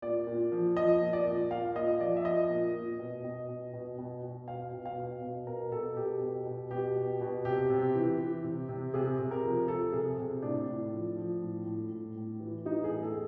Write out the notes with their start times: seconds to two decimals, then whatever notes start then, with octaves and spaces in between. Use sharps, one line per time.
0.02 A#2 D5
0.27 A#2
0.52 F3
0.76 F3 D#5
1.02 A#2
1.13 D5
1.26 A#2
1.51 A#2 F5
1.76 A#2 D#5
2.00 F3 D5
2.16 E5
2.25 F3 D#5
2.50 A#2
2.75 A#2
2.99 B2
3.24 B2
3.49 B2
3.73 B2
3.98 B2
4.23 B2
4.48 B2 F5
4.73 B2
4.86 F5
4.98 B2
5.22 B2
5.47 B2 A#4
5.72 B2 A4
5.96 B2 G4
6.22 B2
6.46 B2
6.70 B2 G4
6.96 B2
7.21 B2
7.45 C3 G4
7.70 C3
7.95 E3
8.19 E3
8.44 C3
8.69 C3
8.94 C3 G#4
9.19 C3
9.31 A#4
9.44 F3
9.68 F3 A4
9.92 C3 G#4
10.18 C3
10.42 A2 D4
10.67 A2
10.92 F3
11.17 F3
11.42 A2
11.66 A2
11.91 A2
12.16 A2
12.40 E3
12.65 E3 D#4
12.84 G#4
12.90 A2
13.03 A4